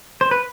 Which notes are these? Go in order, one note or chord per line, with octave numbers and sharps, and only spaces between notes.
C5
B4